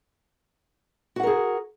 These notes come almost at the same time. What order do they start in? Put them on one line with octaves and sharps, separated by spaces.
F#4 F#5 A#4 G#4